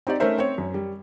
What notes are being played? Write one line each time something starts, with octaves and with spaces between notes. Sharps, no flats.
C4 D#4 G4 D5
A3 C#4 D#4 A#4 C5 E5
C4 C#5
F#2
G3